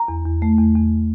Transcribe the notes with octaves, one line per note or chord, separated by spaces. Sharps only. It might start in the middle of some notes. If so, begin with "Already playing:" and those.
Already playing: A#5
E2
E2
A3
E2
E2